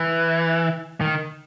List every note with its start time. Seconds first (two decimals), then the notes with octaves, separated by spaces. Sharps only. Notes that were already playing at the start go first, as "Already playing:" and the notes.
Already playing: E3
1.01 D#3